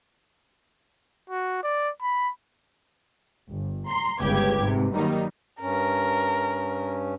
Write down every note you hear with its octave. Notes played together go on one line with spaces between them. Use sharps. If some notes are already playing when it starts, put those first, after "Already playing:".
F#4
D5
B5
G1
A#5 C6
G1 C#2 C#3 G4 B4 G#6
G#2 C3
D#3 F#3 G3 A#3 D#4
G2 C#4 A#4